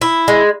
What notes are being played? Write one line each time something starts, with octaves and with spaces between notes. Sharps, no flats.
E4
G#3